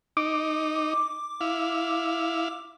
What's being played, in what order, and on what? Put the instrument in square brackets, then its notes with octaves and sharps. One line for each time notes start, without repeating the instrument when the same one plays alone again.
[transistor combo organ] D#4 [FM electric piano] D6
[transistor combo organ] E4 F5